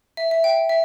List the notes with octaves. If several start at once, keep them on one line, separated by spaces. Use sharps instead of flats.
E5
E5
G5
E5